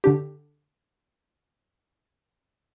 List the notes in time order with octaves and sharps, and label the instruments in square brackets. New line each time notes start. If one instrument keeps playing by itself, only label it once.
[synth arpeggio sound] D3 D4 G4